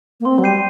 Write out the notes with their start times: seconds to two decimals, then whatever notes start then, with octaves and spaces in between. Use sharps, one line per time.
0.20 A#3
0.25 C4 C6
0.38 F#3
0.43 G3 G6 C7 D#7